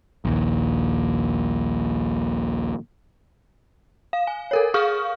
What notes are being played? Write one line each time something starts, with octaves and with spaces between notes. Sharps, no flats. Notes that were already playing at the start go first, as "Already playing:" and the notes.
A#1 D#2
F5
G#5
A4 A#4 C#5
G#4 F5 C#6 D#6 F6